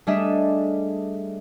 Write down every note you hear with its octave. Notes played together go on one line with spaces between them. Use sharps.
G3 A3 D4 G#4 D#5 E5